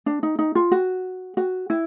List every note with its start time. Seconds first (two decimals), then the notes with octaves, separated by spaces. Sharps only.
0.06 D4
0.23 D#4
0.39 D#4
0.55 F4
0.72 F#4
1.37 F#4
1.70 E4